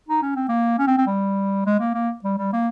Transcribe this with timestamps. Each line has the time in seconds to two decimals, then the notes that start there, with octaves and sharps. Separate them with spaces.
0.08 D#4
0.22 C#4
0.36 C4
0.49 A#3
0.78 C#4
0.87 C4
0.98 C4
1.07 G3
1.66 G#3
1.80 A#3
1.94 A#3
2.24 G3
2.38 G3
2.53 A#3